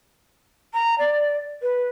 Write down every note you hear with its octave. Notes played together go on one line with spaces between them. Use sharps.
A#5
D5
B4